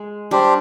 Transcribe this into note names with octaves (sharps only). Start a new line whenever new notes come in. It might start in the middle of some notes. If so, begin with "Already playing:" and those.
Already playing: G#3
G3 D4 G4 C5